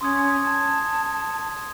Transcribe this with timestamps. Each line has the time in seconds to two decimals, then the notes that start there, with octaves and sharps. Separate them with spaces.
0.01 C#4 C6 D#6 G#6
0.45 A5 G#6